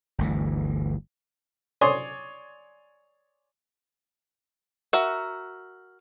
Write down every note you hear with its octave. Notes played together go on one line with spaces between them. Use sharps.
G1 D2 E3
C#5 D5 G#5 C6 D#6
F#4 A#4 E5